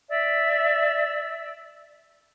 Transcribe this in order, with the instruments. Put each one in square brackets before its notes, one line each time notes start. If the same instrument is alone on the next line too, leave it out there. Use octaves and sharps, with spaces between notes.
[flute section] D5 E5 E6